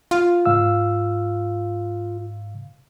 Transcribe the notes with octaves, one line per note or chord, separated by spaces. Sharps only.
F4
G#2 F5 E6